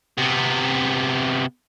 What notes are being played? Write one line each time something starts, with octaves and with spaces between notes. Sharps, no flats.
C3 B3